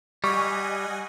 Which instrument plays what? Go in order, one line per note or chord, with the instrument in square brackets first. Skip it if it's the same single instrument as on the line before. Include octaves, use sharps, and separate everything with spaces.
[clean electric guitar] G3 [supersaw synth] D#5 F#5 G#5 [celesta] C#6